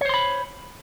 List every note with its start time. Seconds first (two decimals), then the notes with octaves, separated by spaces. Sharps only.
0.01 C#5
0.05 C5
0.09 C6
0.14 B5